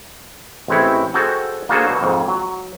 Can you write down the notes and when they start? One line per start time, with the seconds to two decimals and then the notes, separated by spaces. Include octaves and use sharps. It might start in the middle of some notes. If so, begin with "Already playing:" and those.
0.68 A1 G#3 C4 E4 C#5
1.14 F#4 G#4 A4 C5 D#5 G5
1.69 A#3 D4 F#4 G#4 A4 C5
1.86 B2 F#3
2.01 F2 G#2
2.28 F#3